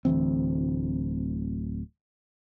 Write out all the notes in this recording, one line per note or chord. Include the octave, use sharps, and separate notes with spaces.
D1 D2 E3 C4